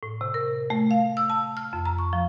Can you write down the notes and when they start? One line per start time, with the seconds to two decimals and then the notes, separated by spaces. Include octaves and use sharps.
0.03 A2
0.21 C3
0.34 A#4
0.70 A3
0.91 F5
1.17 E6
1.30 A5
1.57 F6
1.73 F2
1.85 A#5
1.99 C#6
2.13 F3